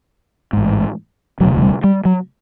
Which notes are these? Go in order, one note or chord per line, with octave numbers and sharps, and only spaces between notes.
A1 G#2
E1 D2 C3 F#3
F#3
G3
G3
F#3